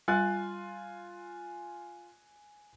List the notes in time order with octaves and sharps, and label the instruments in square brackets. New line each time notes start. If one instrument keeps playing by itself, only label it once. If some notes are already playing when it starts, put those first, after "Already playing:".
[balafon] G3 [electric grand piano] F4 [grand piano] G#5 F#6 A6